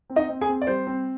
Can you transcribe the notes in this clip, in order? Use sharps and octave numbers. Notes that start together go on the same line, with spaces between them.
C4
D#4 D#5
C4
G#4 G#5
C4
D5
G3 C5
C4